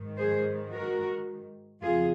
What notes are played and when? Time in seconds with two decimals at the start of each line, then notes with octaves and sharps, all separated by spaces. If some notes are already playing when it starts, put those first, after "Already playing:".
Already playing: G#2 D#3
0.18 G#4 C5
0.73 F#4 A#4
1.82 F2 C#3 F4 G#4